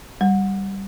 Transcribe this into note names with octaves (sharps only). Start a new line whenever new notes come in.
G3